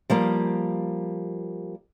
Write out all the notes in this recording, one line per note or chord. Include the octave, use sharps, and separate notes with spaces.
F3 G3 A#3